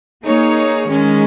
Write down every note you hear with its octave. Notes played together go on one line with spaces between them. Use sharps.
A#3 D#4 G#4 C#5
D#3 G#3 C#4